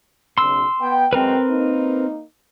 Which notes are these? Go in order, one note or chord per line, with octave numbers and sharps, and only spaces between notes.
B1 C#3 C6 E6
B3 G5
F#2 G#3 C4 A#4 B4 G5
A#3 D#4